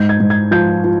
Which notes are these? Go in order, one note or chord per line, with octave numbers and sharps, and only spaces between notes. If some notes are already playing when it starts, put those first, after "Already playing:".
Already playing: G#2 G6
G#6
G#2
G#6
F3 G6
F3